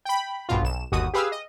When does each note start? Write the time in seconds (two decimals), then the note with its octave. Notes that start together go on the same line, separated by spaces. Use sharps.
0.05 G5 B5
0.49 A#1 G2 B2 F4
0.63 B1 E7
0.92 G1 D#2 F#4 D#6
1.14 G4 G#4 B4 F5 E6
1.32 D#5